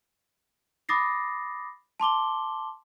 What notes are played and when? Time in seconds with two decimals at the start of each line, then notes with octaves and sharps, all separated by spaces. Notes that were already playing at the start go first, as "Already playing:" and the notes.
0.89 B5 D6 D#6 A6 A#6 C7
2.00 A5 C6 D6 G7